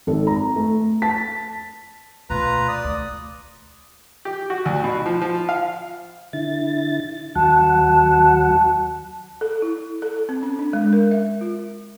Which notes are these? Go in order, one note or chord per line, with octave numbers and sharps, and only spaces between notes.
G#1 A4
A#5
A3
A5 B6
D2 B2 F4 B4 A#5
D5 D#6
D2
G4
F#4
D2
B2
F3
F3
F5
D3 E4 A6
D#2 F#3 F#5 A5
A4
E4
A4
C4
C#4
D4
G#3
A#4
E5
F4